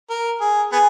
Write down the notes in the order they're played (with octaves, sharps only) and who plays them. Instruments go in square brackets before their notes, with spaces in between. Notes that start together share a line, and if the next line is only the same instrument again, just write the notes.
[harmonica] A#4
G#4
B3 G#4